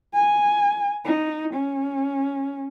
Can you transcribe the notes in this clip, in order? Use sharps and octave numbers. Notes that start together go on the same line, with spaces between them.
G#5
D#4
C#4